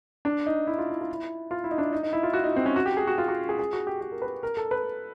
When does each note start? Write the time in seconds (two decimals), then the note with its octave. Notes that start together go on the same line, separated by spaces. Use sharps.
0.25 D4
0.46 D#4
0.67 E4
0.78 F4
0.90 E4
1.01 F4
1.13 E4
1.51 F4
1.64 E4
1.71 D#4
1.78 D4
1.93 D#4
2.03 D#4
2.13 E4
2.23 F4
2.33 F#4
2.44 D#4
2.56 C4
2.66 C#4
2.76 F#4
2.86 G4
2.97 G#4
3.07 F#4
3.18 F4
3.28 F#4
3.49 G#4
3.59 G#4
3.73 F#4
3.87 G4
4.01 G4
4.11 A#4
4.22 B4
4.43 A#4
4.57 A4
4.71 B4